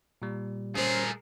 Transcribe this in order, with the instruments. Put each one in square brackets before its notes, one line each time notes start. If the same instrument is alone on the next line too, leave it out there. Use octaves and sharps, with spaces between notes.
[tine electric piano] A#2 G3
[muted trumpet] A3 [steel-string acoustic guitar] C#4 C5 [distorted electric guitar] G#4 A#4